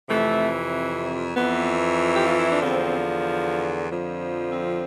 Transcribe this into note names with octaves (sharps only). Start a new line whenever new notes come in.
F2 C3 E3 A3
F2 E3 B3
G4
F4
E4
D4
E2 D3 F3 C4
F2 D3 F3
C4